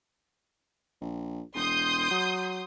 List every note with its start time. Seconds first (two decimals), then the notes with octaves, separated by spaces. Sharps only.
1.01 A#1
1.55 E1 C6 D#6 G6
2.11 F#3